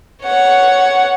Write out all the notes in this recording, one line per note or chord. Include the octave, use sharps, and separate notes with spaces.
C#5 F#5